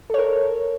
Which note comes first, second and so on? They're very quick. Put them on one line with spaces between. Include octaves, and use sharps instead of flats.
A4 C#5 A#4